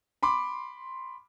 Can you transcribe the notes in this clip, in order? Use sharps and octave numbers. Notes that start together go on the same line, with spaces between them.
B5 C6 D6